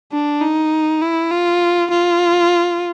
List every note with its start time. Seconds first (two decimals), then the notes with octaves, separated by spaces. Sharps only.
0.12 D4
0.42 D#4
1.02 E4
1.31 F4
1.90 F4